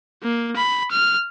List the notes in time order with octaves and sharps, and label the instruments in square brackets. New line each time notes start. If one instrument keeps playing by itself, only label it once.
[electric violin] A#3
B5
F6